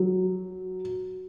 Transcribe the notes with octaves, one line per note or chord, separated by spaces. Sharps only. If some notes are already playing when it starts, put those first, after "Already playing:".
Already playing: F#3